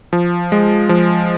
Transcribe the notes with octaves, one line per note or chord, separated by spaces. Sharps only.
F3
G#3
F3